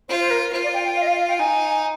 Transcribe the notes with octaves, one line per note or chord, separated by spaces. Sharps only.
F4 C5
C5
A#4
F4 C5
D5
G5
G5
F5
D#5
F5
F5
G5
D#4 G#5